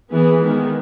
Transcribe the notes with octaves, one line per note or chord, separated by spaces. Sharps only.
E3 B3 G#4
D#3 G#3 B3